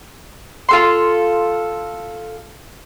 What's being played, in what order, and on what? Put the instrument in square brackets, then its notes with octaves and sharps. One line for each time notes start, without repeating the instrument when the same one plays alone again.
[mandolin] F4 A4 C6